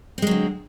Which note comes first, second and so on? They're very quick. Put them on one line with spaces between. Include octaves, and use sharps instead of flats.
C4 G#3 F#3 D3